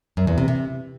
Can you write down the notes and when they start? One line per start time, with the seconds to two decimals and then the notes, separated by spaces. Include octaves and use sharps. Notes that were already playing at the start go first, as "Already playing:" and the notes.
0.17 F#2
0.27 E2
0.38 C3
0.48 C3